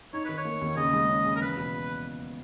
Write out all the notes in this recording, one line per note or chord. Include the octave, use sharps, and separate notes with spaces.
D#4 C#5
D#3 B4
C#5
A#3
D#2
C#3 D#5
G#3
C#4
C#3
A#4
E2 B4
B2